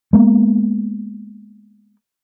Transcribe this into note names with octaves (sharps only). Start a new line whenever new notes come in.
G#3 A#3 B3